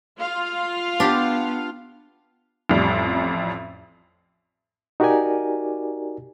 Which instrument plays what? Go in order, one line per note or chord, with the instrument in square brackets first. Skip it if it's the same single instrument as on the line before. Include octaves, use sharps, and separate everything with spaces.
[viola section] F4 F5
[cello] B3 [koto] D4 G4
[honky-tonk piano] A1 F2 G3
[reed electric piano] D#4 F#4 G4 A#4 D5 G#5